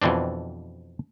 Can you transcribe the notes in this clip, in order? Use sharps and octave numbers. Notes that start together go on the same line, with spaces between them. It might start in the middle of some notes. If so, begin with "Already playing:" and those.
F2 B2 E3 C4 D4